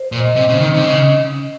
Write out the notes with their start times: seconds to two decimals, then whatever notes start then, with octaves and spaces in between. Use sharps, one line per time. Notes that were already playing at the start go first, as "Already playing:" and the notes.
Already playing: C5
0.12 A#2
0.20 D#5
0.36 C3
0.49 C#3 C#4
0.60 D#3
0.74 C3
0.83 C#3 D#5